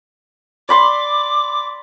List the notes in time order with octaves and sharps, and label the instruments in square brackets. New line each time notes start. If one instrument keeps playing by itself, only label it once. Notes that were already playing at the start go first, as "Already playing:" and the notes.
[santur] D5 B5 C6 [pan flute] D6